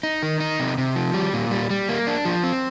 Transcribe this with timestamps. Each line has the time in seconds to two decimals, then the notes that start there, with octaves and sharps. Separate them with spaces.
0.03 D#4
0.23 D#3
0.40 D#4
0.60 C3
0.78 C3
0.96 F3
1.14 G3
1.33 A#2
1.51 G3
1.70 G3
1.89 A#3
2.07 D4
2.25 F3
2.44 C4